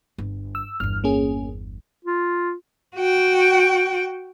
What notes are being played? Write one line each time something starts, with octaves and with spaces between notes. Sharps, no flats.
G1
E6
G1 E2 F6
A#3 C#4 G#4
F4
F#4 G5